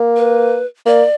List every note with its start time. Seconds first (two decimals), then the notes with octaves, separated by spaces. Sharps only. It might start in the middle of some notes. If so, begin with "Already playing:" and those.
Already playing: A#3
0.16 B4
0.86 A#3 D5